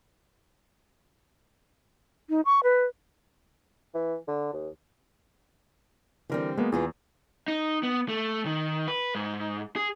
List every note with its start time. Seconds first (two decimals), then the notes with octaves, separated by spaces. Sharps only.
2.29 D#4
2.45 C#6
2.63 B4
3.94 E3
4.28 D3
4.53 D#2
6.30 D3 E3 G3 C4 A#4 D5
6.57 F#3 G#3 A#3 B3
6.72 E2 E3 F4 G#4
7.48 D#4
7.83 B3
8.09 A3
8.46 D#3
8.88 B4
9.15 G#2
9.76 G#4